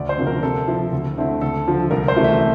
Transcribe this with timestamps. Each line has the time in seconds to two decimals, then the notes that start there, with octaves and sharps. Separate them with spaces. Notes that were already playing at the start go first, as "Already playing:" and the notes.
Already playing: D2 D5
0.09 C5
0.18 C3 F3 A#3 D4
0.27 A#4
0.43 C3 A4
0.68 F3 C4 E4
0.92 D2
1.18 D3 A3 C4 E4
1.41 D2 A4
1.66 D3 F3
1.91 C2 A#4
2.08 C5
2.17 C3 E3 A3
2.24 E5